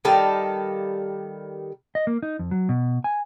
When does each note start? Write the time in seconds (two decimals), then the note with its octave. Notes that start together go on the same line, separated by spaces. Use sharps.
0.05 D#3 G3 A4 F5
1.95 D#5
2.07 A#3
2.23 D#4
2.39 F2
2.51 F#3
2.69 B2
3.04 G#5